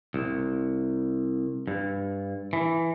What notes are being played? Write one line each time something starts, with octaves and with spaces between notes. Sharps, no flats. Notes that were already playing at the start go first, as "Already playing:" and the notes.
C2
G2
E3